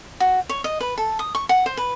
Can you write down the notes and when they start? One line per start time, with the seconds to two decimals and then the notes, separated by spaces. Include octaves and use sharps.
0.20 F#4
0.49 C#5
0.64 D#5
0.80 B4
0.98 A4
1.19 D#6
1.35 C#6
1.49 F#5
1.66 C5
1.77 B4